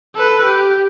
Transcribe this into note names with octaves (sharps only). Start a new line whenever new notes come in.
A4 B4
G4